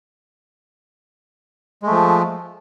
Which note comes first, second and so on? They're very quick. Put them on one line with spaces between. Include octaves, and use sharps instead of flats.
G#3 A3 F3